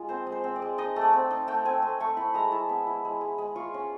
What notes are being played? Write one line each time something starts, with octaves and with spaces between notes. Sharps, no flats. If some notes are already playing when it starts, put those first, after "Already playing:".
Already playing: G#3 F4
C4 C5
G#3
C5
C4
D5
G#3
D#4 D#5
A3
D5
C4
D#4
A3 G5
C4 G#5
A3
A3 C#6
E4 B5
G#3 A#5
E4 A5
B3
E4
G#3
G#3
G#3
F4 C#6
C#4